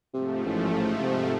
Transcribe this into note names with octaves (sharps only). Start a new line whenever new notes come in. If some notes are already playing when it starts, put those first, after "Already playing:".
G#2 C3 F3 A3
A1
C3